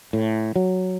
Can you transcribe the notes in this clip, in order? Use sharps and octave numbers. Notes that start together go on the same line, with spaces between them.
A2
F#3